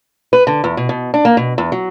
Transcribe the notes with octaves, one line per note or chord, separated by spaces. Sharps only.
B4
D3
E2
B2
B2
D4
A#3
B2
E2
F#3